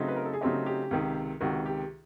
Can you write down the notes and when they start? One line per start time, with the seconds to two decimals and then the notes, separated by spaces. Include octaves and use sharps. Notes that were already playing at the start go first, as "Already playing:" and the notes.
Already playing: C#3 F#3 A3 C4 D#4
0.08 B4
0.16 A#4
0.25 A4
0.34 G#4
0.41 C#3 F#3 A3 C4 D#4 G4
0.66 G4
0.91 C#2 C3 D#3
1.41 C#2 C3 D#3 F#4
1.66 G4